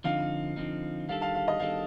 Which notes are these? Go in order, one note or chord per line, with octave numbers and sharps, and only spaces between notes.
D3 F3 C4 D#4 F5
D3 F3 C4 D#4
D#3 G3 D4 A4 F5
F5 A5
F5
D#5
D#3 G3 D4 A4 F5